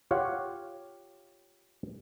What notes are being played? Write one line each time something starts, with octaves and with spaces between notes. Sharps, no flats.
F4 G4 C#5 F5 F#5